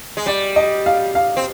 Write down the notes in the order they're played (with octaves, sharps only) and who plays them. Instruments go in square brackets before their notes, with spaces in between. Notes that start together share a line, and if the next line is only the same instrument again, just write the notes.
[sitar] G#3
[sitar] G3 [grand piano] D5
[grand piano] D#5
F5
F5
[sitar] C4